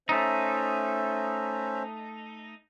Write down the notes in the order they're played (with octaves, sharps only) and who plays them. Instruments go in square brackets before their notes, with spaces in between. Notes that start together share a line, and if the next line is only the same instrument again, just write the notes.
[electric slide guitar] A3 D#4 [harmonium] C#4 C5 E5